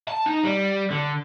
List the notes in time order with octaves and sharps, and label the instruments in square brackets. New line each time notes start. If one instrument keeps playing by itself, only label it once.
[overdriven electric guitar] A5
D#4
G3
D3